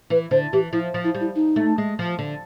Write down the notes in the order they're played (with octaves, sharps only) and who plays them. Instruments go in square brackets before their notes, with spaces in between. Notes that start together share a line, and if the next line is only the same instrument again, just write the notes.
[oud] E3 [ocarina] B4
[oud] D3 [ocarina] C5
[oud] E3 [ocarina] G4
[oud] F3 [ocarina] E4
[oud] F3
[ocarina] E4
[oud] G3
[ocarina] E4
D#4
[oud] A3
G#3
F3
D3